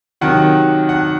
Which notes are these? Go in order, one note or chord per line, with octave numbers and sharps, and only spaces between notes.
C3 D#3 F#3 F#5
F#5